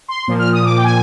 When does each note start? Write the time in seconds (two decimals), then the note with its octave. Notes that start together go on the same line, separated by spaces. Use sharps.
0.08 C6
0.28 A#2 F3
0.39 F6
0.52 D#6
0.65 D6
0.77 G5
0.84 G#5